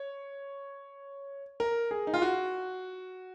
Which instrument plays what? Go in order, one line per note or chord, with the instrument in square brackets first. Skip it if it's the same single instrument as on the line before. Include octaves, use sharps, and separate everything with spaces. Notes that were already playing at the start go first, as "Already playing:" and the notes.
Already playing: [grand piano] C#5
A#4
G#4
D#4
F4
F#4